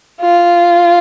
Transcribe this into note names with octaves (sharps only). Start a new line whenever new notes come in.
F4